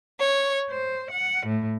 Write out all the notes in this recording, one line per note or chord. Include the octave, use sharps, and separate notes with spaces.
C#5
C5
F#5
A2